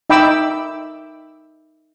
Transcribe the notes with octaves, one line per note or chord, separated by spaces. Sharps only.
D#4 E5 G5 B5 D6 E6